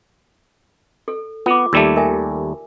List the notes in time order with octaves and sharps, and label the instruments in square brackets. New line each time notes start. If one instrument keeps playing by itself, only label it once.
[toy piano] A4
[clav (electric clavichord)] B3 [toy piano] F4 D6
[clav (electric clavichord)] D#2 G3 A3 [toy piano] E6
[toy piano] A#4 E5 G#5